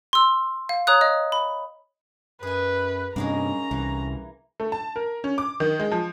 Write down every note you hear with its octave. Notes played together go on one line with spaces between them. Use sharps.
C6 E6
F5
C#5 A#5 D#6 F#6
D#5
B5
F#2 G#4 B4 G#5
G2 C3 A#3 C#4 D#4 G#4 A#5
C2 E3
A3
A5
A#4
C#4
D6
D#3
G#3
F3